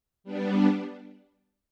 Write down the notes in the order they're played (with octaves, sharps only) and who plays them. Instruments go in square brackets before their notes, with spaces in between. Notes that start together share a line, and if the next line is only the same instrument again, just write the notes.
[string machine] G3 B3 D4